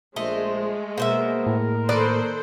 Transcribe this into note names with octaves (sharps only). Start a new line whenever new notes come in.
A#1 G#3 A3 C5 D#5
B2 A#3 A#4 C5 E5
A2
D#3 A4 B4 C5 D5